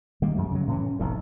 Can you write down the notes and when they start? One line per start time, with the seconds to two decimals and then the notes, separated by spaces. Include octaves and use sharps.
0.22 D#3 G3 G#3 A#3
0.35 F#2 F#3 A3
0.51 C#3 F#3
0.67 A2 E3 C#4
0.99 F1 B1 A2